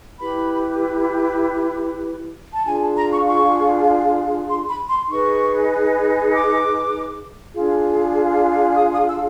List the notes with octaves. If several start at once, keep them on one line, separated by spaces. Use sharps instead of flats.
E4 G4 B4 B5
A5
D4 F4 G#4 G#5
A5
A#5
C#6
C#6
C6
B5
C6
D#4 G#4 B4 C#6
D6
D4 F4 G#4
D#6
D#6
E6